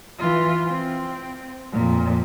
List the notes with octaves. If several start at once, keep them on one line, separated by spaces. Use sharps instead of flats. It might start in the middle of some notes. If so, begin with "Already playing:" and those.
E3 F4
C4
F2 A#2